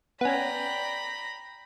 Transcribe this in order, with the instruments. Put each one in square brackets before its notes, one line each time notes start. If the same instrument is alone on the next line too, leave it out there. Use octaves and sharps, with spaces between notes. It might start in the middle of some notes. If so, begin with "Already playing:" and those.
[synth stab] B3 C#4 [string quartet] D5 G5 [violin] A#5 B5